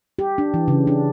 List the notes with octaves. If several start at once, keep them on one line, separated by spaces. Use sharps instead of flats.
G4
D4
E3
C#3
D4